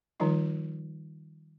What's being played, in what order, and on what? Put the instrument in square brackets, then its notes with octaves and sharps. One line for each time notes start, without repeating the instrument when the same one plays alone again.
[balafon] D#3 F3 G3 D#4 F4